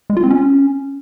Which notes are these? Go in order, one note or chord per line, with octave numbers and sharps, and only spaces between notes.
G#3
F4
C4
C#4